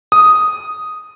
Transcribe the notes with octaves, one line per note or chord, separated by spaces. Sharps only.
D#6